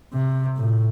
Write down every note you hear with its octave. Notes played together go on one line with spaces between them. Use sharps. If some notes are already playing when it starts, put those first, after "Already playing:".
C3
A2